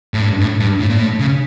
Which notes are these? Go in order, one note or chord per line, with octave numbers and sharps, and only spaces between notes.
A2
G2
A2
G2
A2
A#2
A2
C#3